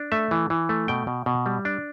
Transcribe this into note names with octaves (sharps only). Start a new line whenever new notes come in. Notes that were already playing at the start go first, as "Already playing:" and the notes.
Already playing: D4
A3 E5
E3
E3
A3
B2 G5
B2
B2
G3
D4